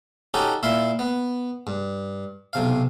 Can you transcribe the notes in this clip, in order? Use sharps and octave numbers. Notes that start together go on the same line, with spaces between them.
C#4 D#4 F#4 G4 A4
A#2 E4 E5 F5 C6
B3
G2
B1 C3 F5